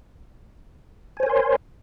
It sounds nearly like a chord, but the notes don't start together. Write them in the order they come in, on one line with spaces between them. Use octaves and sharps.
G#5 C5 C#5 A#4 C6